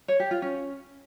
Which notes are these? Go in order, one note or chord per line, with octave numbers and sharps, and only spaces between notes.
C#5
G4
F4
C#4